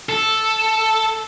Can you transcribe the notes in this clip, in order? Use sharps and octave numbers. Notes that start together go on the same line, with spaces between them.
A4